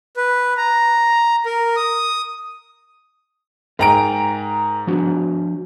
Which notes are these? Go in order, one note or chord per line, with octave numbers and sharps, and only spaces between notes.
B4
A#5
A#4
D#6
G#2 A#4 G5 G#5 A#5 D7
F3 D4 F#4